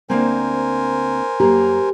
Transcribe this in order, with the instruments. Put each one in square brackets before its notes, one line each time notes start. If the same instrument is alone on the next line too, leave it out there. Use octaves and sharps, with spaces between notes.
[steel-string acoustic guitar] D2 A#3 C4 [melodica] A#4 C5 G#5
[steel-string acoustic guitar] F#2 A#3 A#5 [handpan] G4